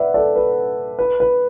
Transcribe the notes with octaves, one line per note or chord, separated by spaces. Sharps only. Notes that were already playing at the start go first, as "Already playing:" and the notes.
Already playing: B4 D5 E5 F#5
A4 D5
B4
B4
B4